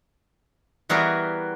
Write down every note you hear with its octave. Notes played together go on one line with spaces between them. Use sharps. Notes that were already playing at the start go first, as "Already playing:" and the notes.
E3 G3 B3 F#4 G#4 A#4